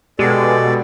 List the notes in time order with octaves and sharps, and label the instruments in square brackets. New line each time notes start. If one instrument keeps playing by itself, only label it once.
[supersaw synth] B2 [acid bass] G#3 [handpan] G4 [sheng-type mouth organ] A4 D5